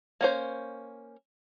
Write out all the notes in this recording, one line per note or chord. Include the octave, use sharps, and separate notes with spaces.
A#3 C#4 C5